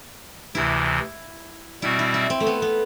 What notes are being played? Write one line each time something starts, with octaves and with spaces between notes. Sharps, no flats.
D2 C3 E3 E4
B2 G3 C4 E4 F#4
E4
E4
C4
A3
B3
B3